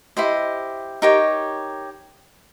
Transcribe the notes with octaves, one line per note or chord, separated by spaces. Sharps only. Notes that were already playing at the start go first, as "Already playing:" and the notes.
E4 G4 C5 D#5
D#4 G4 A#4 C#5